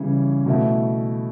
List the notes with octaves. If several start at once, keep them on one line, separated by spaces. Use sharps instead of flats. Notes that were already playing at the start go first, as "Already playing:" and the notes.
Already playing: C#3 E3 G3 C#4
B2 A3 E4